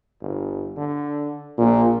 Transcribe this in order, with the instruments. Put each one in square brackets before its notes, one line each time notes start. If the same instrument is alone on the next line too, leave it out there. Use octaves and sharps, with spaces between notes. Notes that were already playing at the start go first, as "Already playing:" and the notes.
[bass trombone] G1
D3
[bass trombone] A#1 [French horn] A#2